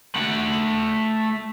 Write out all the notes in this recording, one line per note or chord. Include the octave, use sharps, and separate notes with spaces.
A3 F#5